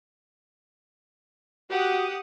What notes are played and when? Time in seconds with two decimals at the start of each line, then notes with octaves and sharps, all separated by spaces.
1.71 F#4 G4 F#5 D#6